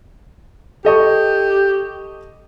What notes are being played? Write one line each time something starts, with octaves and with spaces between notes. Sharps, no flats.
G4 A4 D#5 C#6